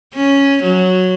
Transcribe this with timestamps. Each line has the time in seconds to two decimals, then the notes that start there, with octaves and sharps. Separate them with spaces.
0.14 C#4
0.63 F#3